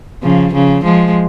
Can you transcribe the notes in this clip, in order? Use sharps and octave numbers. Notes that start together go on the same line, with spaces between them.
C#3 F3
C#3 F3
F3 G#3